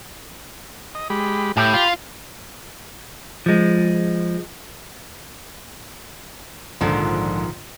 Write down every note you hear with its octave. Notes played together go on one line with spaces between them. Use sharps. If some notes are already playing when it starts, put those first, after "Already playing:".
D#5
G#3 G4 B5
A2 G4
F4 B5 C6
F3 G#3
A#1 G#2 D3 D#3 F3